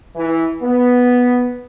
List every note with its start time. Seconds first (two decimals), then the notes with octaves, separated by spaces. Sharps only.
0.14 E3
0.61 B3